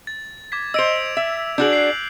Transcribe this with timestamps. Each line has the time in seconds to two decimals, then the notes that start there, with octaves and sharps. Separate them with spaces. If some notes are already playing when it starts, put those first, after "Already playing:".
0.07 A6
0.52 D6 G#6 B6
0.74 C5 D#5 E6 D7 F7
1.17 E5
1.58 D4 F#4 G#4 G6 F#7
1.73 F#6 C7